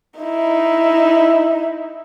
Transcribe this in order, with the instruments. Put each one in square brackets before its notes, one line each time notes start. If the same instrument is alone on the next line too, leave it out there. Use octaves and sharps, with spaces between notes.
[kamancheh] D#4 E4